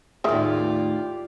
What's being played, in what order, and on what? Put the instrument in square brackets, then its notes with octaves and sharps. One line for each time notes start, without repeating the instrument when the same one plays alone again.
[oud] D#2 A2 [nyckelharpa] F4 D5 [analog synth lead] G4 [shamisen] G#4 A#4 E5